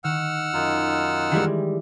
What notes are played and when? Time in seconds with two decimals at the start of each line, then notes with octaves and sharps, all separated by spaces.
0.04 D#3 F#5 E6 F6
0.54 F#2 D#4 F4
1.32 D#3 E3 G3 G#3 G4